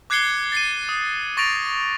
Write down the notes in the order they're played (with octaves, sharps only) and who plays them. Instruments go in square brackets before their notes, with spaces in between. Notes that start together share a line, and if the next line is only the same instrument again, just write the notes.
[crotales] D6 F#6 G#6 C7 C#7 G7
A6 C7 D#7
D#6
C#6 A6 A#6 D7 F7